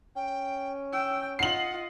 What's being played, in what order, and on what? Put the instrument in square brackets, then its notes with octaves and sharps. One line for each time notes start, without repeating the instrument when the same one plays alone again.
[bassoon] C#4 [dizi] G5
[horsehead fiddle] G5 [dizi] E6
[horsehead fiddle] F4 D#5 [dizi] F#5 [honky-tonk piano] C7 F#7